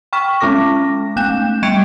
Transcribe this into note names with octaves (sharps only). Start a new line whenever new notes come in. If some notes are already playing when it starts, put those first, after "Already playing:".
G5 C#6 F6 B6 E7
G#3 C#4 A4 D6 A#6
A3 B3 F#6 G6 E7
G3 G5 C#6 G#6 C#7 D7